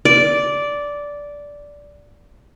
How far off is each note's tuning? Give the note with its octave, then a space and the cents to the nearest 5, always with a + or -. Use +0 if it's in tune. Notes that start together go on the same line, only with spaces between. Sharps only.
D5 -10